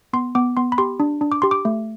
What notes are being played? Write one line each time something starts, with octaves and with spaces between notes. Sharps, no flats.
B3 C6
B3 D6
B3 C6
B5
G4 C6
D4
D4
D6
G4 C6
D6
A3